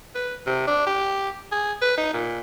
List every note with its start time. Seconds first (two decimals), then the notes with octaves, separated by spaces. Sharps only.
0.15 B4
0.47 C3
0.67 D4
0.86 G4
1.52 G#4
1.82 B4
1.98 D#4
2.13 A#2